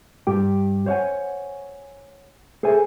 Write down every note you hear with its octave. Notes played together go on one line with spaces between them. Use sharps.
G2 G4 G5
C5 C#5 F5 F#5 G#5
G#4 A4 C5 E5 G#5